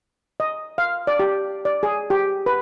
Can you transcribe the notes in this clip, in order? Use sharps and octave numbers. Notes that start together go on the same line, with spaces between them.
D#5
F5
D5
G4
D5
G#4
G4
B4